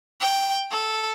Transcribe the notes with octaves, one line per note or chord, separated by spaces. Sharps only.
G5
A4